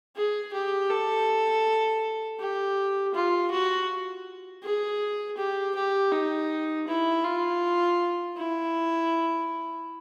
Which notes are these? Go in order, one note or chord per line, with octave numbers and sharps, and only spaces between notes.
G#4
G4
A4
G4
F4
F#4
G#4
G4
G4
D#4
E4
F4
E4